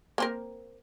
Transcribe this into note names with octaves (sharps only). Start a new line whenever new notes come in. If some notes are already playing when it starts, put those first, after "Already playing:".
A#3 C4 A#4